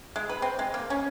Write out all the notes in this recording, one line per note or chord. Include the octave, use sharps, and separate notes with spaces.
G#3
B4
C4
G#3
A#3
C#4